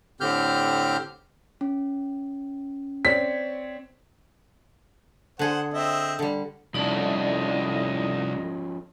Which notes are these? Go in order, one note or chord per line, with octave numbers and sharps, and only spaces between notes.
A2 D3 C4 G4 F6 G6
C#4
C4 C#5 D5 B6
D3 G#4 C5 F#5
C4 D#5 E5
D3 G3
C2 A2 F3 C#4 D#4 A4 D5 D#5